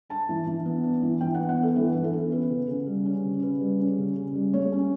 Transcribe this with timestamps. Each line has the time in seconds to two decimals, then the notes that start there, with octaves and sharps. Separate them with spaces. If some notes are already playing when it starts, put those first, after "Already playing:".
0.09 D4 A5
0.29 E3
0.47 E3
0.65 B3
0.84 D4
1.02 E3
1.21 E3 G5
1.35 F#5
1.40 B3
1.49 F#5
1.58 D4 A4
1.76 E3 B4
1.95 E3
2.04 A4
2.13 B3
2.32 C#4 B4
2.50 C#3
2.69 C#3
2.87 G3
3.06 C#4
3.24 C#3
3.42 C#3 B4
3.61 G3
3.80 C#4
3.98 C#3
4.16 C#3
4.35 G3
4.53 A3 C#5
4.72 C#4